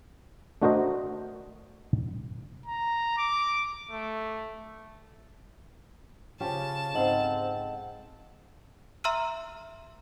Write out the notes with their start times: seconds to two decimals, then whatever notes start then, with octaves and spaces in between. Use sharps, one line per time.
0.62 A3 D4 F#4 A#4 C5 D#5
2.66 A#5
3.18 D6
3.91 A3
6.40 C#3 C#4 F4 G4 G5 A5
6.95 G#2 C4 A4 D#5 F5 F#5 F#7
9.04 E5 A#5 C6 E6 F6 D#7